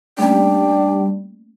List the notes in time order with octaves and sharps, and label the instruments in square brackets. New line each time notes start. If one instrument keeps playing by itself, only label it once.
[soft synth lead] G3 [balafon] A3 A#3 C#4 [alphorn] D4 [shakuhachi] G5